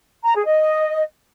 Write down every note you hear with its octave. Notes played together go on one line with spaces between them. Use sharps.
A#5
G#4
D#5